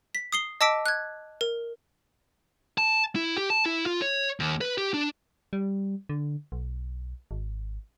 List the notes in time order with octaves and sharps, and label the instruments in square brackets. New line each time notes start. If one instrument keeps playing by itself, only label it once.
[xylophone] B6
D#6 C7 G7
D#5 A5 D6 E6 B6 D7
F#6 G#6
A#4
[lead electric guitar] A5
E4
G4
A5
E4
F4
C#5
D#2
B4
G4
D4
[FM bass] G3
D3
B1
G#1